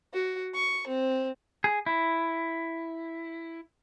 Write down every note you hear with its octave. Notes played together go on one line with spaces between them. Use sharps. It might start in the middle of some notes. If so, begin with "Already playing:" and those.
F#4
C#6
C4
G#4
E4